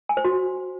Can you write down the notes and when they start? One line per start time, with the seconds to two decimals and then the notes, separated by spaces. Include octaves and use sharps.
0.09 G#5
0.17 C5
0.25 F#4